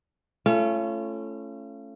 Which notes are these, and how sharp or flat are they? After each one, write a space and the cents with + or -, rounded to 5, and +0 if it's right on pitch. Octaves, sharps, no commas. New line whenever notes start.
A3 +0 C#4 -5 F4 -40